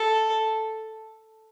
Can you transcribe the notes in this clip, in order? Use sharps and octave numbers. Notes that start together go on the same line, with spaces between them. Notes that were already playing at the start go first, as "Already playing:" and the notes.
Already playing: A4